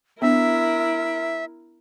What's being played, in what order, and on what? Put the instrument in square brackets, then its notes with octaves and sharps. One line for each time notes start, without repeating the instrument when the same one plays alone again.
[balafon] B3 D4 [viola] E4 A#4 [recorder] E5